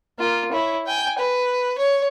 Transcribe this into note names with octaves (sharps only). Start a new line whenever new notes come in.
A#3 F4
E4 C#5
G5 G#5
B4
C#5